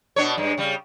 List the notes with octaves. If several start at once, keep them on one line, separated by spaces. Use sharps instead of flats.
B2 D4 C#5
G2 G#3
C#3 G3